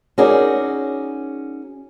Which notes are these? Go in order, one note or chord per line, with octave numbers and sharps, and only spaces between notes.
C#4 D#4 F#4 G#4 A#4 D5